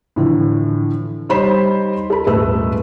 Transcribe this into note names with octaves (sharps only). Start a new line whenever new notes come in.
A2 D3 E3 F3
G3 D#4 C5 C#5 B5 E7
A4 A#4 B5
D#1 G#2 A3 B4 E6